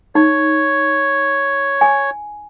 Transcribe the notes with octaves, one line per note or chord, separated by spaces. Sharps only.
D#4 C#5
G#5